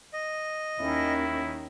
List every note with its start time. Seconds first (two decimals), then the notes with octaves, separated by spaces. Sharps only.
0.14 D#5
0.80 D#2 D#3 C#4 E4